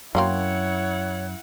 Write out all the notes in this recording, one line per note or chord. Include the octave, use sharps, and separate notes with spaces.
F#2 F#3 A#3 C4 E4 C#5 F#5